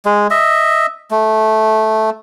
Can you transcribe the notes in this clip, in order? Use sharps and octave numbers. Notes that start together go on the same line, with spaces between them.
G#3
D#5 E5
A3